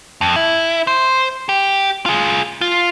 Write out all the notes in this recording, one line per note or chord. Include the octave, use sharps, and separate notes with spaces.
F2
E4
C5
G4
F4 G#4
F4